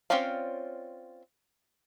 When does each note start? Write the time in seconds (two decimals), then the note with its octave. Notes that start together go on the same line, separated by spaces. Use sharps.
0.10 C4 C#4 F4 D5 F5